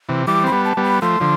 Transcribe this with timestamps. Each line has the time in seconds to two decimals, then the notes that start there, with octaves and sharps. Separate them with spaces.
0.09 C3 E3
0.27 E3 G3 D6
0.44 C4 B5
0.52 G3 B3
0.65 A5
0.77 G3 B3
0.84 B5
1.02 F3 A3 C6
1.20 D3 F3